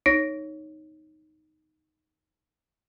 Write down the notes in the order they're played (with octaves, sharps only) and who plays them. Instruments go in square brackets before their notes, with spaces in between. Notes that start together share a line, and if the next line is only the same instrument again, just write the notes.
[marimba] D#4 C#5 A#6